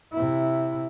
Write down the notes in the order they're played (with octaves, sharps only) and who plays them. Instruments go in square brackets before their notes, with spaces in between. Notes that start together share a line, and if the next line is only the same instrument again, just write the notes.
[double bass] C3 E4